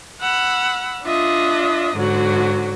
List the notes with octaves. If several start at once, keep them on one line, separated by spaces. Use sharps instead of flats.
F#5 B5 E6
D4 F4 D#5 E5
G#2 D3 F#3 F#4